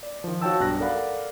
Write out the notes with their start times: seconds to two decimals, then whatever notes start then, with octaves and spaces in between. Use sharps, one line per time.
0.03 D5
0.24 D#3 F3
0.42 F#4 C#5 F5 G5 A5 E6
0.60 B1 G2 F#6 A#6
0.80 A4 A#4 D5 F5 F#5 B5